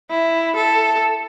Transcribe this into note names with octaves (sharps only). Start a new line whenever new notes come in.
E4
A4